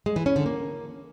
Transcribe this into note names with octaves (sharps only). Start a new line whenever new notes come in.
G#3
E3
C#4
D3
A#3